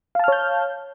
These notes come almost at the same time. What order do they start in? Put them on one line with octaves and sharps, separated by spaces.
F5 A5 F6 C#5 G6